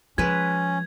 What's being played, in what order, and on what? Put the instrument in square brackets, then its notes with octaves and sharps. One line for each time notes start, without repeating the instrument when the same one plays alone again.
[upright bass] F3 [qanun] G#3 B4 [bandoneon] C#4 [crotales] G#6